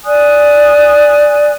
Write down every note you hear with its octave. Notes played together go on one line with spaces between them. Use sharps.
D5 G#5 D#6 F#6